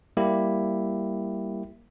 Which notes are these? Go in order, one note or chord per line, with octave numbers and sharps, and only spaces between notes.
G3 A#3 E4 G4